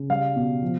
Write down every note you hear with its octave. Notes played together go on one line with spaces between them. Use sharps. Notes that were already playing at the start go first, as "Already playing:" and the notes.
Already playing: C#3
G3 F5
B2
F3